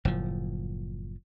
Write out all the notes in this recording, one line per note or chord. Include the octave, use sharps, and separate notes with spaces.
F#1 A2 F3